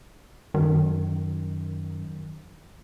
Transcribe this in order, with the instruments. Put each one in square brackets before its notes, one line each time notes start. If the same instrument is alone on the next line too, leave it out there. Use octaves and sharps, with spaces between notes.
[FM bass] F#2 [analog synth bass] D#3